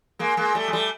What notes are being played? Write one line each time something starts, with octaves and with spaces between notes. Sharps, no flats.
G#3 A#3
G#3 A#3
G3 A3
G#3
G3 A3